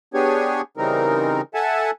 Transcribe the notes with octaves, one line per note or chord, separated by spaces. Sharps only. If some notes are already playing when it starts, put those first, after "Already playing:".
B3 D4 G4 G#4 C#5 G#5
C#3 E3 G3 C4 D#4 A#4
A4 E5 F#5 G#5 A5